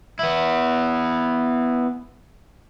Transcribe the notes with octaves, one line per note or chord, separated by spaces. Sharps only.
B3 E4